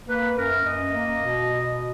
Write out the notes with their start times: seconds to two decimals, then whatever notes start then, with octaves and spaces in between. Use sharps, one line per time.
0.08 A#3 B4
0.37 F#2 A#4
0.66 F#2 D#5
0.95 A#3
1.24 B2
1.52 B2